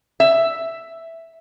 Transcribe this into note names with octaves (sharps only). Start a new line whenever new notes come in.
E5